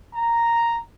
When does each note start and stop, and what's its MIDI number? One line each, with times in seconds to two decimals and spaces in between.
0.13 0.78 82